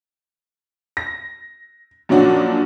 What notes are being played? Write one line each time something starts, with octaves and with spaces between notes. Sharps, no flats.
A#6
F#2 A#2 F3 C#4 D4 F#4